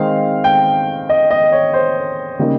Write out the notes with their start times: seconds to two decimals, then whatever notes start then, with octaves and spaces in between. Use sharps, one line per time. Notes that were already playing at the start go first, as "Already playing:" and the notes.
Already playing: D#3 G#3 C4 D#4 F5
0.44 G5
1.09 D#5
1.31 D#5
1.52 C#5
1.74 C5
2.39 C#3 G3 A#3 D#4